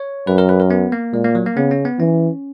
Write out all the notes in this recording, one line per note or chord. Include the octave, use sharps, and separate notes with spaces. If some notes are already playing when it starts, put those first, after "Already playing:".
Already playing: C#5
F#2 B4
A#4
B4
A#4
B3
A#3
A#2 G#3
A#3
F#3
A#3
C#3 B3
C#4
B3
E3 C#4